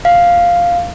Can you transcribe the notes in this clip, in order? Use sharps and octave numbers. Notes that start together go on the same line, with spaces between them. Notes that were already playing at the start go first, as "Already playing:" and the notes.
F5